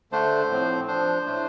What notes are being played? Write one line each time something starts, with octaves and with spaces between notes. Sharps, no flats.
D3 A3 D4 C5
A2 F3 C4
F3 D4 C5
A2 A3 D4